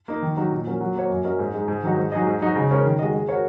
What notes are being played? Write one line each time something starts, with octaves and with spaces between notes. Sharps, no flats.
A#3 D#4
D#3
F#3 D#4 F#4
A#2
F#3 C#4 A#4
F#3
A#3 F#4 C#5
F#2
F#3 C#4 A#4 D#5
G#2
G#3 D#4
G#2
D#3 F#3 D#4
G#2
F#3 D#4 G#4 D#5
G#2
F#3 D#4 F#4
C#3
G#3 C#4 A#4 C#5
D#3
G#3 F#4 D#5
G#3
F#4 A#4 C#5